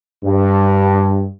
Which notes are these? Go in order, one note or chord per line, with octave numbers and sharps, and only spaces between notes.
G2